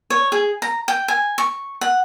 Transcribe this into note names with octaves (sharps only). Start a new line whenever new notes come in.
C#5
G#4
A#5
G5
G#5
C#6
F#5